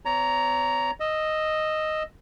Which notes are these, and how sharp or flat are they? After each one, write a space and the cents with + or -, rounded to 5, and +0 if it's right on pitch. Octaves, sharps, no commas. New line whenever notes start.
C4 -40 C#5 +40 A#5 +0
D#5 +0 E6 +0